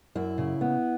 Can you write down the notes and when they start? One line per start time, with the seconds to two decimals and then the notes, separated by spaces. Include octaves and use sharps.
0.15 F#2 E4
0.38 C#3
0.61 B3